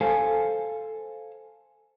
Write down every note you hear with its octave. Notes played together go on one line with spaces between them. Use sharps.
A4 C5 F5 G#5